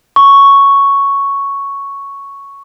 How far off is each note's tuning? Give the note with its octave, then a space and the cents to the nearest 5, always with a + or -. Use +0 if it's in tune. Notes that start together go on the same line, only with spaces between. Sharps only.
C#6 +0